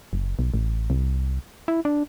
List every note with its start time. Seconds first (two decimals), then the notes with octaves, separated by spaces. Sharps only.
0.13 F#1
0.39 B1
0.54 A1
0.90 C2
1.68 E4
1.85 D4